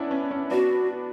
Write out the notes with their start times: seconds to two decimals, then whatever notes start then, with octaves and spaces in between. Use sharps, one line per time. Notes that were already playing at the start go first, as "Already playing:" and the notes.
Already playing: B3 C#4 D4 E4
0.11 C#4
0.31 C#4
0.51 B3 D4 F#4